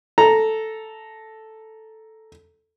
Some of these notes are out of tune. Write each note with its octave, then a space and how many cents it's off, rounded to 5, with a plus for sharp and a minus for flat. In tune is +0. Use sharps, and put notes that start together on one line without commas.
A4 +0 A#5 +0